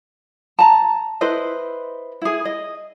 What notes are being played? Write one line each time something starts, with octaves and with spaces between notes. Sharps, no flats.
A5 A#5
E4 B4 C5 D#5
E4 G#4
D#5